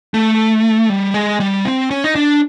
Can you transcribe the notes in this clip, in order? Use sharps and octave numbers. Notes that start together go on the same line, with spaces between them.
A3
G3
G#3
G3
C4
C#4
D#4
D4